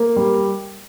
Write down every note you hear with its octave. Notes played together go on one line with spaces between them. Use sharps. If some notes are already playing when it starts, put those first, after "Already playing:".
Already playing: A#3
G3